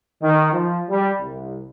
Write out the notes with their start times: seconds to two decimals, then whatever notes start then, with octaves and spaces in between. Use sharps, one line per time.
0.22 D#3
0.53 F3
0.90 G3
1.20 C2